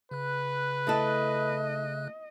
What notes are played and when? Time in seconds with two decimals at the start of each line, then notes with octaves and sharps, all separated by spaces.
0.11 C#3 B4 F#6
0.87 A3 E4 A4 D#5